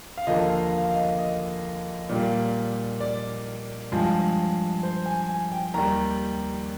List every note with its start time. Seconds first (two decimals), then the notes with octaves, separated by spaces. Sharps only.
0.18 F5
0.27 D#2 D3 F3 A#3 D#5
0.50 F5
0.72 F5
0.85 F5
0.96 D#5
1.19 D#5
2.09 A#2 G3 A#3
3.00 D5
3.92 G2 F3 G#3
4.83 C5
5.06 G#5
5.29 G#5
5.52 G5
5.74 D#2 D#3 G3 A#5